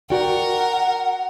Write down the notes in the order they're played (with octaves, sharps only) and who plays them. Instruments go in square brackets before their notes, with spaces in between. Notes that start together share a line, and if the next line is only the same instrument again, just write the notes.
[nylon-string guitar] F#4 D5 G5 [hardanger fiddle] A#4 [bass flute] F#5